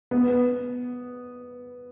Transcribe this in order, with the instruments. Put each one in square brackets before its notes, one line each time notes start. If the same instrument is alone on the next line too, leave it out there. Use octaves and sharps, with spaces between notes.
[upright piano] B3